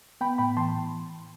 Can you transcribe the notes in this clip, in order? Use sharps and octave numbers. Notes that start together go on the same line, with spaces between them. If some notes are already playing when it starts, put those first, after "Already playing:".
B3 G5 B5
A2 G5 B5
E3 A5 C6